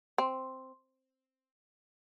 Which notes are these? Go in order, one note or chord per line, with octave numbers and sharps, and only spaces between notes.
C4